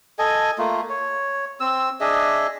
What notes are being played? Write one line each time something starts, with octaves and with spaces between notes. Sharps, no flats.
A4 D#5 G#5
A3 A#3 F4
C#5
C4 E6
D4 G#4 D#5 E5